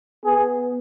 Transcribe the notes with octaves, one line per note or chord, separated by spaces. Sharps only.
B3 G#4